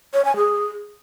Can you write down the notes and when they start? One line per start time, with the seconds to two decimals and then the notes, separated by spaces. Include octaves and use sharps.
0.14 C#5
0.25 G#5
0.36 G#4